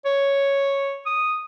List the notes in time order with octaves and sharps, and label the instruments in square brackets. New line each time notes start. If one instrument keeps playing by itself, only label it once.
[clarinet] C#5
D#6